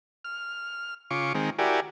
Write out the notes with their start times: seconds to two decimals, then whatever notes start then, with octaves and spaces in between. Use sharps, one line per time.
0.24 F6
1.11 C#3 F4 C#6 D6
1.35 D#3 G#3 C4
1.59 E4 F#4 G4 A#4 D5 G#5